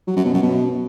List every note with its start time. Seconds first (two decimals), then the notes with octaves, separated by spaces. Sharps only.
0.07 F#3
0.16 F#2
0.25 B2
0.34 F#2
0.42 B2